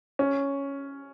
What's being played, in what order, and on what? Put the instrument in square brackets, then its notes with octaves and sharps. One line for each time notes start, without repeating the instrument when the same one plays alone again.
[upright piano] C#4